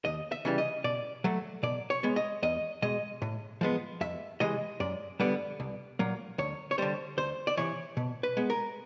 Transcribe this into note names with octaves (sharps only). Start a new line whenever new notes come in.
D#2 D#5
E5
C#3 E3 G3
D#5
B2 D5
F#3 A3
B2 D5
C#5
G#3 B3
D#5
E2 D#5
B2 G#3 D#5
A2
F3 G#3 B3
F2 E5
C3 E3 G#3 D#5
F#2 D5
D3 G3 B3 D5
C2
A#2 F#3 A#3
D2 C#5
C#5
D3 G3 C5
D2 C5
D5
C3 E3 C#5
B2
B4
G#3 B3
A#4